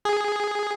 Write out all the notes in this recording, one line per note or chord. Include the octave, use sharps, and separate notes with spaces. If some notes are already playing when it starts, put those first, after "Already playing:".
G#4